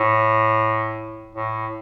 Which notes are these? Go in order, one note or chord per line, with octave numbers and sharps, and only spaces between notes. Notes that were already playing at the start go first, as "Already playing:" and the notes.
Already playing: A2
A2